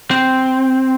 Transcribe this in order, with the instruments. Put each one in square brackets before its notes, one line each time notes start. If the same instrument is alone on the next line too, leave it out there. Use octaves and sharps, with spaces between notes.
[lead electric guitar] C4